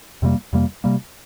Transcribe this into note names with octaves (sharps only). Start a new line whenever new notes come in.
F2 C3 G3 A#3
F2 C3 G3 A#3
C3 G3 A#3